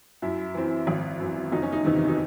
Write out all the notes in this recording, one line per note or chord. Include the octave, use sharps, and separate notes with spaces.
F#2 E4
E3 C4
G#1
F#2 E3
F#1 D#4
C#4
D#4
E2 C3 D#3
D#4